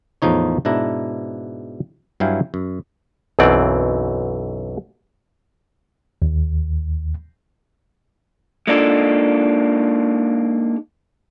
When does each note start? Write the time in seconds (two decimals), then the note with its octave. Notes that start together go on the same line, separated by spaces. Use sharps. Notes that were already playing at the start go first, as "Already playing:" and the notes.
0.22 E2 A2 F3 D#4 C#5
0.65 G#2 B2 D4 E4 A#5
2.20 G2 F#3 E4 F5 G5 G#5
2.54 F#2
3.39 B1 F#2 B2 E3 C4 D5
6.22 D#2
8.67 G#3 A#3 D4 D#4 F4 A4